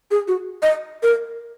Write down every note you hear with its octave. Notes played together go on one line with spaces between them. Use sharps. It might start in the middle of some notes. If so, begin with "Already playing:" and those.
G#4
F#4
D#5
A#4